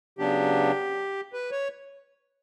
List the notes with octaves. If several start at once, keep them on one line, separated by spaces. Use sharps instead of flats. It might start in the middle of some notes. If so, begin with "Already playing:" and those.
C#3 F#3 B3 D4 G4
B4
C#5